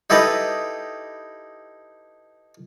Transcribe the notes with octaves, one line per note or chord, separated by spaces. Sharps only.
D#4 E4 G4 A4 B4 D#5